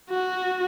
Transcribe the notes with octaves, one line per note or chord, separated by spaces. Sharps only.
F#4